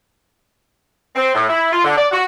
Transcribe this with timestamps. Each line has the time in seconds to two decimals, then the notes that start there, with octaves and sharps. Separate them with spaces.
1.15 C4
1.35 A2
1.48 E4
1.73 F4
1.84 D3
1.97 D5
2.12 F#4